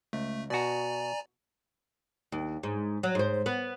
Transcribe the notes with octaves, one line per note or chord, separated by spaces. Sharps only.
C#2 A3
B2 F#4 D5 G#5 A#5
D#2
G#2
F#3
G#2 C5
B3